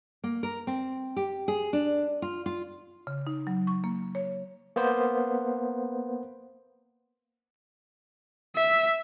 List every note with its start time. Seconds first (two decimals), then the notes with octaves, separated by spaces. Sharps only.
0.24 A#3
0.43 A#4
0.67 C4
1.16 G4
1.48 G#4
1.73 D4
2.22 F4
2.46 F4
3.07 C#3
3.27 D#4
3.47 F#3
3.67 C#6
3.84 A#3
4.15 C#5
4.76 A#3 B3 C5
8.56 E5